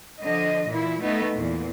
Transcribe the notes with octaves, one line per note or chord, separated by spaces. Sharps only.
D3 F3 D#5
A#2 E3 E4
A3 B3 D#4
E2 A#2